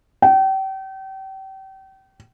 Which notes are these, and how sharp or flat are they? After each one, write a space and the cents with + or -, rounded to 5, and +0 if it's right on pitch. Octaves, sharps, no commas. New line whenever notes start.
G5 -35